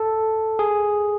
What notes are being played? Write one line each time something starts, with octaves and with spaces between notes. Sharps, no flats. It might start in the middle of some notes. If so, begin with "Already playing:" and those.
Already playing: A4
G#4